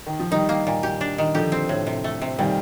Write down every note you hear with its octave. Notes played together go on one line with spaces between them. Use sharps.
D#3
F3
D#3 G3 D#4
A#3
A#2
G4
D4
D#3
D3 F3 G4
C4
A2
C3
A3
C3
A#2 D#3 G3